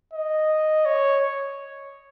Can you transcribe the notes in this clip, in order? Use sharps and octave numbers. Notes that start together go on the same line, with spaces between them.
D#5
C#5